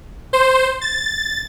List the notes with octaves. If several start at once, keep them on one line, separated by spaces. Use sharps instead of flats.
C5
A6